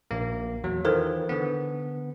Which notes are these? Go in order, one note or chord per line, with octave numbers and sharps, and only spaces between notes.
A#1 A#3
E2 F#3
D#3 E3 F4 A4 A#4 C5
D3 B3